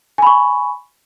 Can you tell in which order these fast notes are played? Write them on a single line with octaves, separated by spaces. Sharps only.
G#5 B5 C#6